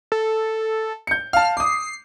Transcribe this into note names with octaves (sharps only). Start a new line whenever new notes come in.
A4
G6 C#7
F5 A5 F6
D6 D#6 C7